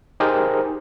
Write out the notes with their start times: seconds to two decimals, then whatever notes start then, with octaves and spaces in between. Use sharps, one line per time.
0.20 D#4 G4 G#4 A#4 C5